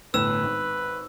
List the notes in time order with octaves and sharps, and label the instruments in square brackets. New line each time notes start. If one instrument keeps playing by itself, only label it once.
[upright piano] G1 A2 E7 [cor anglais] B4 [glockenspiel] E6
[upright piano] G#1